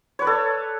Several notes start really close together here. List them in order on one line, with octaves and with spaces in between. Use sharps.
C#5 B4 D5 A4